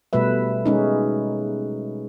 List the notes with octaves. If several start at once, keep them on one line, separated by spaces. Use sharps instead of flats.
B2 G3 A3 B4 E5
G#3 C#4 D#4